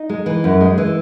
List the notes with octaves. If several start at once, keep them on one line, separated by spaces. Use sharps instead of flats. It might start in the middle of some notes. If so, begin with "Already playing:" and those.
Already playing: D#4
G#3
E3
F#2
G#3
E3